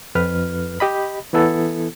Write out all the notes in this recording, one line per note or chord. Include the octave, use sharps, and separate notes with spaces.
F2 B4 F6
G4 D#5 B5
E3 B3 E4 A4